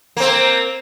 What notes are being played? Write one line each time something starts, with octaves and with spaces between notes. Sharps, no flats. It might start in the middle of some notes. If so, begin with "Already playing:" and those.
A#3 C4